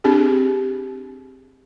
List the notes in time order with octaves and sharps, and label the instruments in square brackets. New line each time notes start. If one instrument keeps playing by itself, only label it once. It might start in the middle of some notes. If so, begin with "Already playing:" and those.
[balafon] C4 D4 G4 G#4